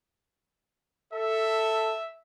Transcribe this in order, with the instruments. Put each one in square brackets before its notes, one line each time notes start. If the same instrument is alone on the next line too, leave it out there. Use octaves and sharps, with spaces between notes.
[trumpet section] A4 [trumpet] E5